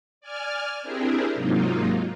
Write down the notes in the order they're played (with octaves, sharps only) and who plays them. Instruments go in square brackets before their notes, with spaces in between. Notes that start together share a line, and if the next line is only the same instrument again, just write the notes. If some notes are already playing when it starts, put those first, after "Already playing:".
[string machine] D5 G#5 F6
C4 D4 E4 G4 G#4 A#4
G#2 C3 F#3 A#3 D#4 F4